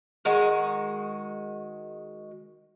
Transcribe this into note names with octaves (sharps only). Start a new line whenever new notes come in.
D#3 G#3 F#4